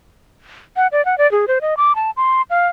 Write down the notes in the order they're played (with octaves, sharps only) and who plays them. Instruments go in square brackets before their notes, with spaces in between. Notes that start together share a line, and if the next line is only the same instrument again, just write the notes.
[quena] F#5
D5
F#5
D5
G#4
C5
D#5
D6
A5
C6
F5